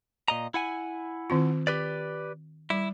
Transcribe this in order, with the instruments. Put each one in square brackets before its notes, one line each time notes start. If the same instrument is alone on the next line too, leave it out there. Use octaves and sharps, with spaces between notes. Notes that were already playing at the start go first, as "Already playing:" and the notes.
[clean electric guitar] A#2 D#5 A#5
E4 F#5 G#5
[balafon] D#3 C4 F4
[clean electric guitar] G4 B4 D5
[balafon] G3 [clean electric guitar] E4